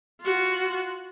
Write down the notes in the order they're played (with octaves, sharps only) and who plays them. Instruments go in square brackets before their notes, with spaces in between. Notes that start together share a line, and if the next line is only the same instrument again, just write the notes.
[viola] F4 F#4